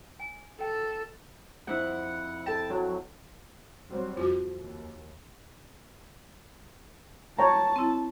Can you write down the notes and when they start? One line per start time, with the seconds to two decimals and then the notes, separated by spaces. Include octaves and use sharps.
0.19 G#5
0.61 A4 G5
1.67 F2 E4 F#5
2.46 A4 G5 A5
2.70 F#3
3.89 F#3 G3 C4
4.17 F2 F4 F#4
4.58 D#2
7.39 C#5 G5 A5 A#5
7.76 C4 E4